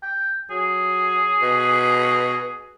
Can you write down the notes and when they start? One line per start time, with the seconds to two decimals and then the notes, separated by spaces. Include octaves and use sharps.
0.02 G5
0.50 F#3 G#4
1.42 B2